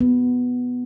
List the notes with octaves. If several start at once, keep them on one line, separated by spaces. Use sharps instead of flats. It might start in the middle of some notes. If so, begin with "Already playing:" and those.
B3